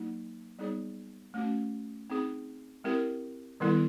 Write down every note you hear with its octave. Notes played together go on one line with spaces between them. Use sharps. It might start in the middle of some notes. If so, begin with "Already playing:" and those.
Already playing: F#3 A#3 D#4
G3 B3 D#4 G#4 C#5
A3 C#4 F#4
C4 D#4 G#4
G#3 C4 E4 G4 A#4
D#3 G3 B3 E4 A4